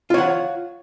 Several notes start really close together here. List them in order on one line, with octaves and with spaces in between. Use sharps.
F4 C#5 F#5